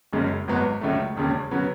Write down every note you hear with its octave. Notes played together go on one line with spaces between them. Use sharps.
F#1 F#2 C#3 G#3
G#1 G#2 F#3 B3
C#2 C#3 F#3 A3
E1 D#2 C#3
C#3 F#3 B3